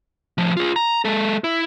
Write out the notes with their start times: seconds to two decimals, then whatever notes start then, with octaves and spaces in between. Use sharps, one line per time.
0.38 A2 F3
0.57 F4 G#4
0.76 A#5
1.05 G#3 A4
1.44 E4